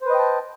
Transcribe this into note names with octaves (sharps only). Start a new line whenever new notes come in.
B4 C5 D#5 G5 A5